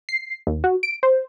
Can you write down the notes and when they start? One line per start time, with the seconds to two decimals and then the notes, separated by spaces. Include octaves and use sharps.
0.09 C7
0.47 D#2
0.64 F#4
0.83 D7
1.03 C5